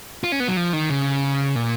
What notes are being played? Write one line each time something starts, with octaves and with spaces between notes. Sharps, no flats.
F4
C#4
B3
F#3
F3
D#3
C#3
A#2